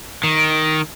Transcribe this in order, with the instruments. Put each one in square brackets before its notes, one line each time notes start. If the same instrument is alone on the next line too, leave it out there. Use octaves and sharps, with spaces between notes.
[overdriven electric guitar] D#3